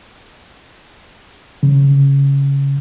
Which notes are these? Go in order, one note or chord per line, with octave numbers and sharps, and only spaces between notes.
C#3